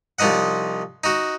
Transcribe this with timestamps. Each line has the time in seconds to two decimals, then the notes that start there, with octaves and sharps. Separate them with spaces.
0.19 C2 F3 D#4 D#5 F#5
1.04 D#4 F#4